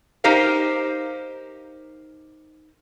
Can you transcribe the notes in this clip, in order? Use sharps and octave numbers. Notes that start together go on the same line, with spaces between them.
D#4 G4 A#4 C5 F5